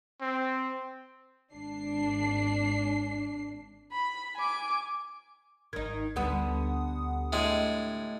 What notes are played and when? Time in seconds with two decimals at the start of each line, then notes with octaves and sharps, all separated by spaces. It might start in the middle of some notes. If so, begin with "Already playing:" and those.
0.21 C4
1.51 G#1 D4 C7
3.92 B5
4.38 G#5 D6
5.73 G#1 D#3 D#4 G#6
6.16 D2 D3 G3 B3 F#5 D#6
7.33 A2 G#3